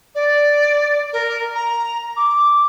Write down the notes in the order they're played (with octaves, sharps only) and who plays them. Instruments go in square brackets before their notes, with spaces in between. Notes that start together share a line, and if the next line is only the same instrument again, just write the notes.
[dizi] D5
A#4
A#5
D6